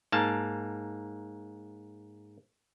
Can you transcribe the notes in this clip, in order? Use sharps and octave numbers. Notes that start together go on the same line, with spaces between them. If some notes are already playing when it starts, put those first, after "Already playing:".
G#2 A#3 A5